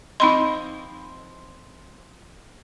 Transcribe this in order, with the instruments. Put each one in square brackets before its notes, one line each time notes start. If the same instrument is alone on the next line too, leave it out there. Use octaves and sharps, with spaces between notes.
[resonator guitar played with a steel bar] F3 C4 D#5 [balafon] D#4 B5 C6